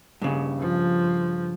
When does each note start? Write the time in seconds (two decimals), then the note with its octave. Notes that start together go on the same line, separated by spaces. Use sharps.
0.22 G2 C#3
0.60 F3